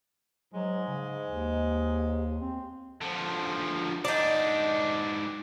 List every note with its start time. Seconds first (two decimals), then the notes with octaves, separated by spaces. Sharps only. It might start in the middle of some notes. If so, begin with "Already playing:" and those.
0.54 G#2 F#3 G#3
0.88 C#3
1.28 D#2
2.41 C4
3.01 D3 F3
4.05 G#2 D4 D#4 D5